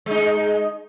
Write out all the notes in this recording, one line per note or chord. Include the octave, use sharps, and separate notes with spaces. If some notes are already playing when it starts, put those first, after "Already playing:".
G#3 D#4